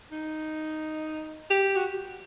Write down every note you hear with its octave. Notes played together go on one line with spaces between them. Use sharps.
D#4
G4
F#4